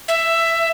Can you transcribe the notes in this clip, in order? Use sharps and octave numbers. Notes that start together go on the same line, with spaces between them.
E5